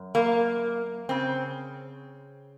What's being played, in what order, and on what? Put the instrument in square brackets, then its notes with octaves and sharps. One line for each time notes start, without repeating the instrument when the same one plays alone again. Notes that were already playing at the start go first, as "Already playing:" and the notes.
Already playing: [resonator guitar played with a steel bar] F#2
A#3
C#3 C4